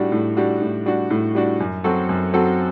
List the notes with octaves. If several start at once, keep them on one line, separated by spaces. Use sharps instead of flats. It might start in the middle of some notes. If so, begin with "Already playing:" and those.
Already playing: A2 G3 D4 F#4
A2
G3 D4 F#4
A2
G3 D4 F#4
A2
G3 D4 F#4
F#2
F#3 C4 F#4 A4
F#2
F#3 C4 F#4 A4